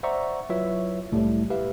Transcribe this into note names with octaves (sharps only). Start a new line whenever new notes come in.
C5 D5 E5 F#5 A#5 C#6
F#3 E4 F4 B4 C#5 E5
C2 A2 G3 A3
G4 B4 E5 F5